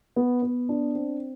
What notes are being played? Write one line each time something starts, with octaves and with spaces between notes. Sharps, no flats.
B3
B3
D4
C4